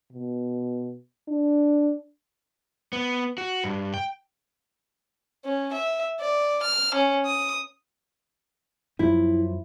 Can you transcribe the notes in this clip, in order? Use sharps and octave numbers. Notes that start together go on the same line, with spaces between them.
B2
D4
B3
F#4
G2
G5
C#4
E5
D5
F6
C#4
D#6
F#2 F3 E4